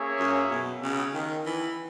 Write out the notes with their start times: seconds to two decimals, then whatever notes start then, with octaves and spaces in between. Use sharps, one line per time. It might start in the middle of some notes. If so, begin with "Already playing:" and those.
Already playing: A#3 C#4 G#4 C#5 E5
0.19 F#2
0.51 B2
0.83 C#3
1.14 D#3
1.46 E3